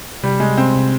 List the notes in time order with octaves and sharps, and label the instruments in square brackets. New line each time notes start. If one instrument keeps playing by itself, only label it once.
[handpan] C3 [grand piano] G3
[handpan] C3 [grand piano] G#3
[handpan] C3 [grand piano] C4
[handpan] C3